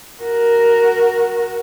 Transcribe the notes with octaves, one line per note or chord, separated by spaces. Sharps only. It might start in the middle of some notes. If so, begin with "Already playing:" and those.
F#4 A#4